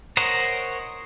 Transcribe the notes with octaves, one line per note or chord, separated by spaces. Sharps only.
A#4 C5 C#5 D#5 F#5